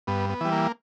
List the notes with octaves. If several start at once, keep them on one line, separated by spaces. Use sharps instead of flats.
G2 B3
B3
E3 G3
A#3